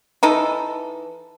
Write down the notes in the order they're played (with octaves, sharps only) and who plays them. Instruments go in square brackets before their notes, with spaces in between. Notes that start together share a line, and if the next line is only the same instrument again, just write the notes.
[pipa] E3 D#4 A4